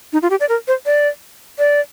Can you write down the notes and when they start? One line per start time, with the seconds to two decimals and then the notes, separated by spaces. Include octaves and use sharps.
0.13 D#4
0.22 F4
0.30 G4
0.40 D5
0.49 A#4
0.68 C5
0.86 D5
1.59 D5